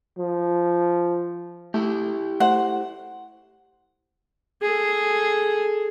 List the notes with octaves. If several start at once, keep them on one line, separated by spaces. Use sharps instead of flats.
F3
A3 E4 G4
A3 C5 F#5
G#4 A4